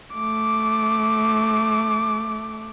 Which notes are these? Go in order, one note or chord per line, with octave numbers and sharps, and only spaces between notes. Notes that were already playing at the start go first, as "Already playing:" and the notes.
A3 D6